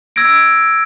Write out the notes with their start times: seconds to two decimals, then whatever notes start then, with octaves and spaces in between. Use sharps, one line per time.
0.16 E6 G#6 A#6 D7